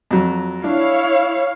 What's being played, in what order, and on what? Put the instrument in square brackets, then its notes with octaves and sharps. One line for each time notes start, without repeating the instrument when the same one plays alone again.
[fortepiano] F2 F#3
[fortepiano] D4 [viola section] E4 C#5 F5